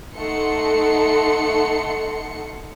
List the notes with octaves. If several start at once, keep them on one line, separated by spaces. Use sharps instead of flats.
A3 D#4 A4 F#5 C6 C#7